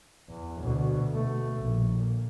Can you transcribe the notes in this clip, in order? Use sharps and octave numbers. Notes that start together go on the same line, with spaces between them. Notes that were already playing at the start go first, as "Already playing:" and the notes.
E2
D2 B2
B2 A3
A#1
A#2